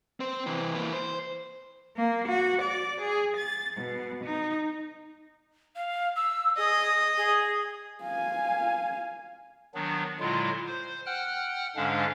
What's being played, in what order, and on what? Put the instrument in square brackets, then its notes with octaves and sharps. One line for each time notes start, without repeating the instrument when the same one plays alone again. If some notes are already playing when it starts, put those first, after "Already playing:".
[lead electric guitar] C4 C5
C3 E3
E3 A#3
C5
[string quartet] A#3
F#4
D5
G#4
A6
B2
D#4
[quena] F5
E6
[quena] G#4 [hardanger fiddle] D#5
[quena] G#4
[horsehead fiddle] F5 G#5
[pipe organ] D#3 F#3 B3 D4
A#2 D3 F#3 G#3 E4 F4
C5
F#5 G5 F6 F#6
G#2 D3 G#3 C#4 D4 F5